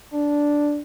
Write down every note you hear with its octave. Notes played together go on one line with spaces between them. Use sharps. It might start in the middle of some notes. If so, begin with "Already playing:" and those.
D4